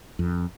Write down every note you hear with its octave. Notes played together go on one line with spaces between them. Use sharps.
F2